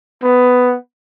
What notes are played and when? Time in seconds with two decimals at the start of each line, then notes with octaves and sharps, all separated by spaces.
0.23 B3